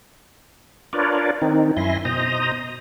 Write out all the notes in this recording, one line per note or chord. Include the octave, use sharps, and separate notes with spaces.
D4 F4 A#4 B4 C#5 D5
D#3 C4 D#4
F#2 E4 E5 G#5 C6 A#6
B2 C5 D#5 A#5 D#6